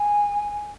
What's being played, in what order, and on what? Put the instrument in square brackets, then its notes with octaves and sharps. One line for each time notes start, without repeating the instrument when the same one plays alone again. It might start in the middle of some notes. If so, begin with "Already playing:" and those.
Already playing: [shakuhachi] G#5